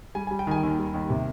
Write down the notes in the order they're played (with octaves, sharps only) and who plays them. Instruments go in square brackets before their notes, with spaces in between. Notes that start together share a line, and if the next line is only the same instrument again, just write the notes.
[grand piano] G3 G#5
G#5
G3
G5
D#3 G#5
D#2
G3
D#2
C3